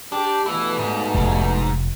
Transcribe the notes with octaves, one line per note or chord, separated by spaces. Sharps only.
D4 G4
G2 B2 E3 A3 E4
G#2
F1 F2